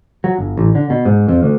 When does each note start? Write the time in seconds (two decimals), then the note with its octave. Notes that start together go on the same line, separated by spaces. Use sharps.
0.24 F#3
0.38 G1
0.57 A1
0.75 D3
0.90 B2
1.05 G#2
1.28 F2
1.43 D2